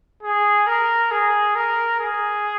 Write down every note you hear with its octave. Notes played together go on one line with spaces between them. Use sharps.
G#4
A#4
G#4
A#4
G#4